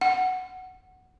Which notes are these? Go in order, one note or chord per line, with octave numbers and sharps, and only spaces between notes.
F#5